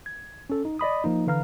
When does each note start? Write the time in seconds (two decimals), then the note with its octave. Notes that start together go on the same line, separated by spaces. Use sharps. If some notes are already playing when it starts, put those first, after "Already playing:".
0.06 G#6
0.50 C#4 A4
0.65 D#4
0.79 D5 D#5 B5 D#6
1.04 F3 A#3 D#4
1.27 D3 E3 B4 F5 A#5 F6